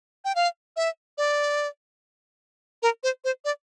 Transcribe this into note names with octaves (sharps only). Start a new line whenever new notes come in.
G5
F5
E5
D5
A#4
C5
C5
D5